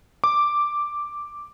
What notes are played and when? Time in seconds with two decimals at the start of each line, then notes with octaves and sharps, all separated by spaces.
0.24 D6